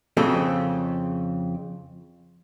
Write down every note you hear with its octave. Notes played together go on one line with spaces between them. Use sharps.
F2 C#3 C4 A4